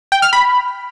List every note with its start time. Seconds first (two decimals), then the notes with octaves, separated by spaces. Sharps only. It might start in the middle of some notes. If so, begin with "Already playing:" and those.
0.12 G5
0.22 F6
0.33 B5